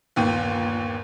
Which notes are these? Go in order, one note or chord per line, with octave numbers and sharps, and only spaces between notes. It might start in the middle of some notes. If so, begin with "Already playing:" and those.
G1 D#2 A#2 G5 D#7